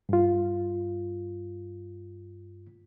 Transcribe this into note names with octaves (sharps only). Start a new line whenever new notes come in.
G2 F4